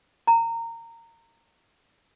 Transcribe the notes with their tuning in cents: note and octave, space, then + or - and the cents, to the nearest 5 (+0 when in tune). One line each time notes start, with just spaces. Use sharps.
A#5 -20